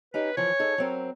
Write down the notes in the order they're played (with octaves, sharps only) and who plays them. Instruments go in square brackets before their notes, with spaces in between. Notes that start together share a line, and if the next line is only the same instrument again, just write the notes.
[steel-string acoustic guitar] C#4 D#4 G4 [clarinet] B4
[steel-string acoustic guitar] E3 F3 [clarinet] C#5
[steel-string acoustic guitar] D#4 G#4 A4
F#3 C4 A#4